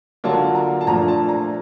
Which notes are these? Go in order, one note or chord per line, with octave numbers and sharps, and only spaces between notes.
D3 F#3 A#3 D4 F4 A5
A#5
A5
A#2 F3 A3 D4 F4 A#5
A5
A#5